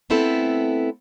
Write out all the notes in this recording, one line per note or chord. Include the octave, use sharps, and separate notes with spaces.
A3 B3 C4 E4 A4